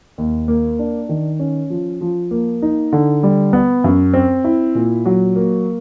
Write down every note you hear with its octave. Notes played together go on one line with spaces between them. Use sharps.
D#2
A#3
D4
D#3
C#4
F3
F3
A#3
D#4
D3
G3
B3
F#2
C4
E4
A#2
F#3
A#3